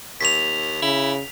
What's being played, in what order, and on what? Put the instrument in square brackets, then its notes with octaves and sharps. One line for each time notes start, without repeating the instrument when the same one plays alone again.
[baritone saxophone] D#2 [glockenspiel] B6 F7
[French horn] C#3 [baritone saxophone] E4